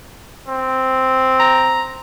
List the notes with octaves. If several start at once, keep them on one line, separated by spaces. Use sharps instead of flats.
C4
A#5